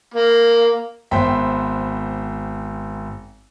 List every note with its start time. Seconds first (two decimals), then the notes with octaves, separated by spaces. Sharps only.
0.14 A#3
1.11 G#1 B3 C5 E5 G5